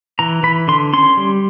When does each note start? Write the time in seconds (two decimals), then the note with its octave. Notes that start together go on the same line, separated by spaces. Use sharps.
0.19 E3 A#5
0.43 E3 B5
0.68 D3 C6
0.93 C#4 C6
1.17 G3